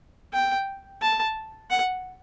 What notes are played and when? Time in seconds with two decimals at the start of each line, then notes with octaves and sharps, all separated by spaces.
0.33 G5
1.02 A5
1.70 F#5